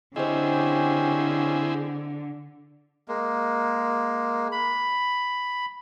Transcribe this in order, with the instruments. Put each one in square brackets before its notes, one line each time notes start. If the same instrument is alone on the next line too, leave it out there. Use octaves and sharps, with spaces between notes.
[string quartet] D3 [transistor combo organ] C4 E4 G#4 [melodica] C#4 G4 [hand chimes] C5 D#5
[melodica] G#3 A#3
B5